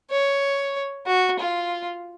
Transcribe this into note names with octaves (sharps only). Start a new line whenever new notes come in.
C#5
F#4
F4